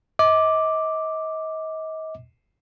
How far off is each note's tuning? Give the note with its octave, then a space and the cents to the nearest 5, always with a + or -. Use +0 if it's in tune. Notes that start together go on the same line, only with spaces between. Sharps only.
D#5 +35 D6 +0